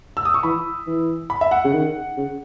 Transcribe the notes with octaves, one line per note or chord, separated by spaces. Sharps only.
E6
D#6
C#6
E3 B5
E3
B5
E5
F#5
C#3
D#3
C#3